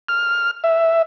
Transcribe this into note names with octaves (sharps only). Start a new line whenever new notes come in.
F6
E5